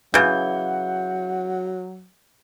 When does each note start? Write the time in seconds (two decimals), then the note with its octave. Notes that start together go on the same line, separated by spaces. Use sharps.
0.14 C#3 E3 F#3 F#5 G6